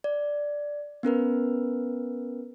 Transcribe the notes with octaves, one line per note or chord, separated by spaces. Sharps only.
D5
B3 C#4 A#4 B4